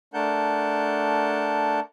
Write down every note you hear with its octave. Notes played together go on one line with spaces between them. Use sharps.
A3 D4 A#4 F#5 A5 G6